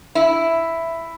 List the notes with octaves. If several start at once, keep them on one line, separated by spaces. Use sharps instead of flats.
E4